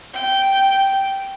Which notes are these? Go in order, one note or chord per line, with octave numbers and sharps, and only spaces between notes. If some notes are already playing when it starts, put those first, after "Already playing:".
G5